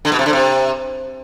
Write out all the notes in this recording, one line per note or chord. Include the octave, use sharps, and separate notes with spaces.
D3
B2
C3
D3
C3